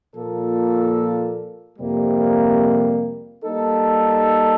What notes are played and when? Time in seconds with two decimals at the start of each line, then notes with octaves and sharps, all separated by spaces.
0.15 A#2 F3 A#3 F4 A4
1.79 F2 C3 G3 A#3
3.43 G3 A#3 D#4 A4